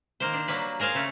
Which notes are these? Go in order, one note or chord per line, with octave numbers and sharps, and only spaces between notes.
D#3 A#3 C5
D4
F#3 G3 A#3 B4
G#4 A#4 C5 F5 G#5
C#3 A3